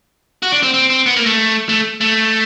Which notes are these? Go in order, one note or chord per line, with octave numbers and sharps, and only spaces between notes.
F#4
D4
C4
C4
C4
B3
A#3
A3
A3
A3